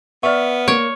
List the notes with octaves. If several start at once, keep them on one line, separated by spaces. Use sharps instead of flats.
B3 D5 E5 C#6 F6
A#3 C#5 D7